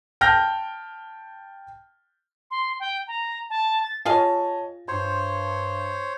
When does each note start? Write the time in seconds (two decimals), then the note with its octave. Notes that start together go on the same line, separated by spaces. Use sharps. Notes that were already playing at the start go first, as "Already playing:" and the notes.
0.21 G5 A5 F6 G6 A#6
2.51 C6
2.80 G5
3.08 A#5
3.50 A5
3.83 A6
4.05 F4 G#4 C#5 D#5 F5 A5
4.88 G2 C5 C#5 C6